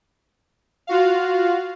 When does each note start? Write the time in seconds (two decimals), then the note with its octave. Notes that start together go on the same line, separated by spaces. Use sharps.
0.87 F4 F#4 F5